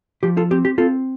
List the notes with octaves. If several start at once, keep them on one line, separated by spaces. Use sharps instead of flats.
F3 G4
F4 A4
C4 G4
G4
C4 F4 A4